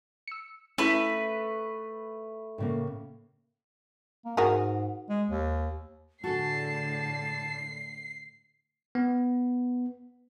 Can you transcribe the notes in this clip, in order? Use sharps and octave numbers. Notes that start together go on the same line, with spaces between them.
E6 C#7
A3 C#4 E4 B4 B6
A2 C#3 A#3
A#3
G#2 F#4 G#4 A#4
G#3
D#2
A2 D3 F#4 G#4 A4 A5 C7
B3